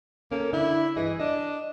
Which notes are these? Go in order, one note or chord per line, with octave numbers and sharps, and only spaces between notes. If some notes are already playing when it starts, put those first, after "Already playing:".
A#3 C#4 A4
D3 D4 E4
G2 E3 G#4 D#5
D4 D#5